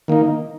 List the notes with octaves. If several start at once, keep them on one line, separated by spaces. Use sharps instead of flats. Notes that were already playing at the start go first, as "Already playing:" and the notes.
D#3 A#3 D#4